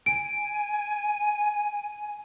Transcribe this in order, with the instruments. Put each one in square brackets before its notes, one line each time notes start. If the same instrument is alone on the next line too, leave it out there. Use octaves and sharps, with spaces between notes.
[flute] G#5 [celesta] D7